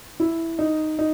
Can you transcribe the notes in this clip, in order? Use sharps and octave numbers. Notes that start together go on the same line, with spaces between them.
E4
D#4
D#4